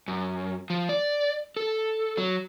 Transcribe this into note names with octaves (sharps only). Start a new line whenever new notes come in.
F#2
F3
D5
A4
F#3